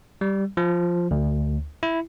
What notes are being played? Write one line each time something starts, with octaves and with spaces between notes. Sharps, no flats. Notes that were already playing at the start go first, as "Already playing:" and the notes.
G3
F3
D2
E4